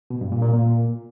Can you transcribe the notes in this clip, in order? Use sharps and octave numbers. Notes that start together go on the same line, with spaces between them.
B2
G2
A#2
A#2
A#2